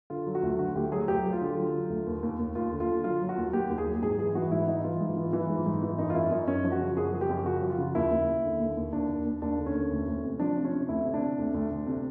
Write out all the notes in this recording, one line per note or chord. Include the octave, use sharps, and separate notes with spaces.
D3 F4
F#3
F#4
D2
D3 F#4
D2 G4
F#3 G#4
D2 G4
F#3
F4
D3
F#3
D3
D2
D#2
D#2
D#2
D#2 F4
D3
F4
D3
F#3 F4
F#3
F#4
D#2
D#2 G4
D#2
G#4
F#3
G#2 G#4
E3 G#4
E3 F#4
G#2 E4
E3 D#4
E3 F4
G#2
E3
E3
G#2
G#2
E3
F#2 D#4
F4
F#2 E4
F#2 D#4
F#2 C#4
F3
F#4
C#3
F#2 G#4
F3
G4
F#2
C#3 F#4
F3
F4
C#3
D#2 E4
D#2
D#2
D3
D#2
D#2
D#2 D4
D#2
D#2
D#2 D4
D3
C#4
D#2
D2
D2
C3
F3 D4
C3
C#4
C3
D2 E4
C3
D4
C3
D2
D2
D2
C3